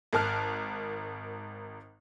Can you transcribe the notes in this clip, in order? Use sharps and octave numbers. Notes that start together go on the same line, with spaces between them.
G#1 A#4 A5 F6 F#6